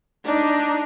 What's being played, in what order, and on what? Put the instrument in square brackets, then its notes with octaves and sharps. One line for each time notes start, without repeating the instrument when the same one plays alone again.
[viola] D4 D#4